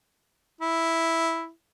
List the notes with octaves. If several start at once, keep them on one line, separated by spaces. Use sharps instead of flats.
E4